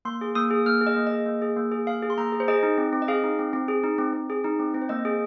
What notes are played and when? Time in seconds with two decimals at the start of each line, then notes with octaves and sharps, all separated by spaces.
0.05 A#3 C6
0.21 G#4
0.35 A#3 D#6
0.50 G#4
0.66 A#3 F6
0.81 G#4
0.87 D#5
0.96 A#3
1.07 D#5
1.12 G#4
1.26 A#3
1.42 G#4
1.57 A#3
1.72 G#4
1.87 A#3 F5
2.02 G#4
2.10 C6
2.18 A#3 A#5
2.32 G#4
2.40 C5
2.48 G#4 D#5
2.63 D#4
2.78 C4
2.93 C4
3.02 D#5
3.08 G#4 F5
3.24 D#4
3.39 C4
3.53 C4
3.68 G#4
3.84 D#4
3.98 C4
4.13 C4
4.30 G#4
4.44 D#4
4.59 C4
4.74 C4
4.82 C5
4.89 A#3 D#5
5.05 G#4